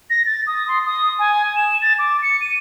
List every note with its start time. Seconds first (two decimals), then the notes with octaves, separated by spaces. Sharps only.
0.10 A#6
0.26 A6
0.47 D#6
0.68 C6
0.85 D#6
1.19 G#5
1.56 E7
1.82 A6
1.99 D6
2.22 C#7
2.41 D#7